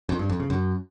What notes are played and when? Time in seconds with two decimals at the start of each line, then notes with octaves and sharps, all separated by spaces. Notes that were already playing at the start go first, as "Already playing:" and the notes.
0.09 F2
0.19 G2
0.30 F2
0.40 C#3
0.50 F#2